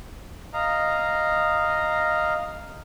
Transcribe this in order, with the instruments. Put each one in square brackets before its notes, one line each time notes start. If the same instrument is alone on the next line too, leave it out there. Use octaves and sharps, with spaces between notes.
[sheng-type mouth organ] D#5 F5 A#5